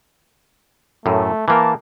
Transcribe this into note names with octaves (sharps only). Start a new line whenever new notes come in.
F#2 A2 A3
E3 A#3 A#4 A5